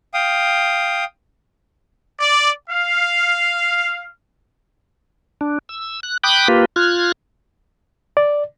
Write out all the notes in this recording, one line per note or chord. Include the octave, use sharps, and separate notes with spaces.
F5 G5 D#6
D5
F5
D4
E6
F#6
G5 B5 D6 D#6 F#6 G6
A#3 F4 G4 B4
F4 F6 F#6 G#6
D5